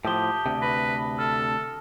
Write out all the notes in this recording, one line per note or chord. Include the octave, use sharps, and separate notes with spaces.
A2 F3 G4 A5 D#6 G7
D2 C3
B4 A#6
A4 F6